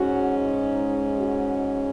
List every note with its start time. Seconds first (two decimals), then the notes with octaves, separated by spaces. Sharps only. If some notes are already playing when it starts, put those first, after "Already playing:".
Already playing: G#2 G#3 C#4 F#4
0.46 D#4
1.19 F#4